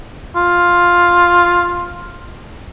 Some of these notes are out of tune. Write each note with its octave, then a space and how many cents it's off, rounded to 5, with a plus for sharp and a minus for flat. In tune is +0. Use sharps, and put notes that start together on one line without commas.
F4 +5